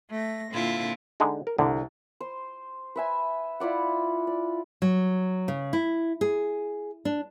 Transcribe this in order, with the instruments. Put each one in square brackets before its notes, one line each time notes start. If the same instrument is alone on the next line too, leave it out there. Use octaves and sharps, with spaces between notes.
[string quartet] A3 A#6
A#2 D3 C4 E4 F4
[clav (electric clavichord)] D3 G#3 D#4
A#4
[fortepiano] C2 [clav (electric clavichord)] D3
[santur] C5
B4 E5 G#5
E4 F4 D5 F#5
D5
[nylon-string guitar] F#3
C#3
E4
G#4
D4